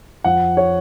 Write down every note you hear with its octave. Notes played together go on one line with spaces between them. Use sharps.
F2 F#5
C#5